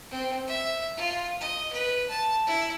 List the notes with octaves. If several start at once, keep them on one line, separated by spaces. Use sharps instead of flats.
C4
E5
F4
D#5
B4
A5
E4